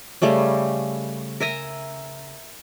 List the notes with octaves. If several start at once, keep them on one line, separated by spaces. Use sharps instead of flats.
C#3 G3 A3 C#4
A#4 E5 G#5 A#5